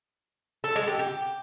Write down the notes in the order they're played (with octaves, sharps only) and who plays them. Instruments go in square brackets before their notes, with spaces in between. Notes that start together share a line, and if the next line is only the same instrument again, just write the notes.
[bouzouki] A4
G#3
G4
G4